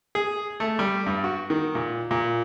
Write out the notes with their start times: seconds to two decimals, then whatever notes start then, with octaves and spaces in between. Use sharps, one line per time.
0.15 G#4
0.60 A3
0.79 G3
1.06 G2
1.24 F#4
1.50 D#3
1.75 A#2
2.11 A#2